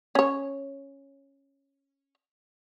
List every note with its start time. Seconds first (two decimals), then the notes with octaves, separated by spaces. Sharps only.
0.15 C#4 C#5